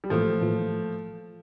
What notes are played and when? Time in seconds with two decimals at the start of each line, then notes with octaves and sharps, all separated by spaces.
0.04 G3
0.10 A2 E3 F3 A3 A#3 F4
0.41 A2 E3 A#3 F4